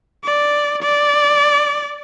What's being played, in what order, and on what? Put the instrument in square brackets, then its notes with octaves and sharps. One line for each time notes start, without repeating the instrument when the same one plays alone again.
[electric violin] D5
D5